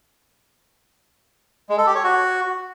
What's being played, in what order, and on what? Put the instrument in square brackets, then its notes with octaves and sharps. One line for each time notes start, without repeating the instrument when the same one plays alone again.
[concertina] G#3
A4
G4
C#5
F#4